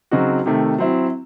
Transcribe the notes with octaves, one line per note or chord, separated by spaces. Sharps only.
C#3 F#3 C4 D#4 F#4
C3 D#3 A3
F#3 C4 E4